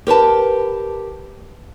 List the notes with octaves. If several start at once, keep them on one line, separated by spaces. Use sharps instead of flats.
G4 A#4 B4 A5